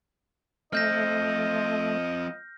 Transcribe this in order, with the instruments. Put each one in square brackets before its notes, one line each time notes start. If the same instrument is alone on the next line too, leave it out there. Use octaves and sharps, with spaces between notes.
[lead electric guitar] F3 C4 [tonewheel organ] A3 [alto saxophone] D#5 [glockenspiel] F6 G6 A#6